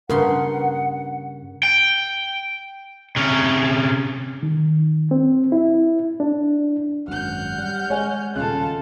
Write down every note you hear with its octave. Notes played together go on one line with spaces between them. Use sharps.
G2 C#3 A#4 F#5 C6
G5
C3 C#4
D#3
C4
E4
D4
G#1 F#2 F#5 F6 G6
G3
G#3 C#5 G#5
D#1 C#3 F4 A4 F#6